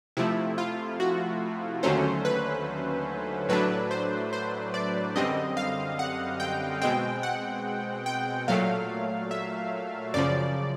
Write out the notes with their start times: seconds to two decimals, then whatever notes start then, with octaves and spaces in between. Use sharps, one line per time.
0.17 C3 F3 A3 E4
0.58 F4
1.00 F#4
1.83 D#2 D3 F#3 A3 C#4 C5
2.25 B4
3.49 A2 F#3 A3 D4 B4
3.91 C5
4.33 C5
4.74 D5
5.16 F#2 D3 G3 C4 D#5
5.57 F5
5.99 F#5
6.40 G5
6.81 B2 G#3 C4 G5
7.23 F#5
8.06 G5
8.48 A#2 F#3 A3 F5
9.31 E5
10.14 F#2 C#3 F3 D5